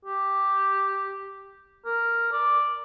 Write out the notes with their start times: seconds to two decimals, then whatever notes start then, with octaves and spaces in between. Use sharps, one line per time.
0.05 G4
1.85 A#4
2.32 D5